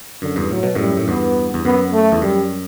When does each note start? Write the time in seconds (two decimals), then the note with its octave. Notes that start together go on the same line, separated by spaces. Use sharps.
0.22 F#2 D3
0.36 E2 G2
0.51 A2 F#3
0.63 B2
0.75 F#2 A2 G3
0.97 A2
1.08 E2 G2 B3
1.54 E2
1.65 F#2 B3
1.93 A3
2.12 E2
2.22 F#2 G3